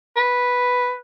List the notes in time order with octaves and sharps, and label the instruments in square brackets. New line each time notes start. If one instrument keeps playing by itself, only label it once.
[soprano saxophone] B4